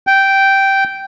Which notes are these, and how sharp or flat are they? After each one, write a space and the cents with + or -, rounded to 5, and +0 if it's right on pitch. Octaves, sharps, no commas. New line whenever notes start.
G5 -10